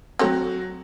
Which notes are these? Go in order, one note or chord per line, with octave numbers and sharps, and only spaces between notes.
F#3 C4 F#4 A4 C#5